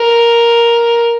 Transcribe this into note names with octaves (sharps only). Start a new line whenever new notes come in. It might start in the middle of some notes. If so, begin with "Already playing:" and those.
Already playing: A#4